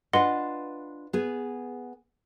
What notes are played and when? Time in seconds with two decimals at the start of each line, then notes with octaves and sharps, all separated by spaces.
0.13 D4 F4 B4 D#5 F#5 C6
1.13 B3 G#4